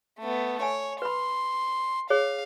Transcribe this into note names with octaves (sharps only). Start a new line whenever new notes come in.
A3 B3
C#5 G#5
B4 B5 C6
G#4 C#5 F5